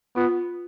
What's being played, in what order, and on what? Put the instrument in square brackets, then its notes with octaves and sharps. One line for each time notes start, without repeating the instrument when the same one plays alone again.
[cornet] B3 [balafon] F4